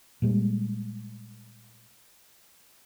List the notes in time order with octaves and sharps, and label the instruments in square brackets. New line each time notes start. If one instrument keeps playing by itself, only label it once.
[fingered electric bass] A#2 G3 G#3